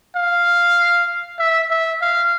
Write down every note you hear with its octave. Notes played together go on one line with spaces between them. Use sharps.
F5
E5
E5
F5